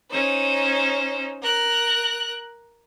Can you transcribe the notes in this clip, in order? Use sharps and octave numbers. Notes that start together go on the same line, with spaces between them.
C#4 D#4 C5
A#4 F#6